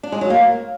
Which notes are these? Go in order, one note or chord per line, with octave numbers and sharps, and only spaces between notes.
D4
G#3
F#3
A#3